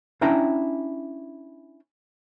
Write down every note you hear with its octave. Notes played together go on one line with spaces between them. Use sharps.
C#4 D4 E4 G5 A#5